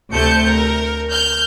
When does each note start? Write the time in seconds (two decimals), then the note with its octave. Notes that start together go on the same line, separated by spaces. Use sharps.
0.12 D2 C3 A3 A5 G6 C#7
0.46 A#4
1.10 F6 G6